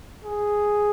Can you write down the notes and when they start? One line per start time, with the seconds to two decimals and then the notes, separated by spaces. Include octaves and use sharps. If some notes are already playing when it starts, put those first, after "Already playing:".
0.24 G#4